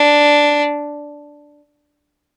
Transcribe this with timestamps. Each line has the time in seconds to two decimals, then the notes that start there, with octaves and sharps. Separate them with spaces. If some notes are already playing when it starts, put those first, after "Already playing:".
Already playing: D4